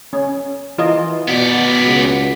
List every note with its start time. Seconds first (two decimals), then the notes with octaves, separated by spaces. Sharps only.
0.13 C#4
0.79 E3 F4 D#5
1.28 B2 B3 D5
1.84 C#2